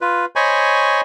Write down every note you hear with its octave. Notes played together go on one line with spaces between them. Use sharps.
F4 B4
C5 C#5 D#5 G#5 B5 C#6